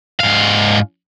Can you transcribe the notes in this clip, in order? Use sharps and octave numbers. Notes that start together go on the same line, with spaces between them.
G#2 F5